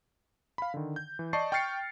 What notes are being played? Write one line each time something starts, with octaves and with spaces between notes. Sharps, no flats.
F5 B5
D3 D#3
G6
E3
D5 D#5 A5 C#6 C7
G5 C#6 F6 A6 C7 C#7